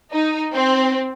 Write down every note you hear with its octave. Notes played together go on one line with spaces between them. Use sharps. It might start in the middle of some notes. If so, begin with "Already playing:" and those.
D#4
C4